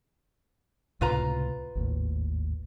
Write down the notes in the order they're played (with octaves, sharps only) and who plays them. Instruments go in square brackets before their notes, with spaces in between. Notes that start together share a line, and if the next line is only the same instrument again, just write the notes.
[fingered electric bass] C#2 A2 C3 [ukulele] F4 B4 A#5
[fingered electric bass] G#1 D#2 A2